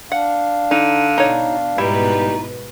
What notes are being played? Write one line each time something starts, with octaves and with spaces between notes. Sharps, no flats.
D4 F5 F#5
D3 D#4
B2 D#4 C#5
G#2 B2 G3 D#4 E4 B4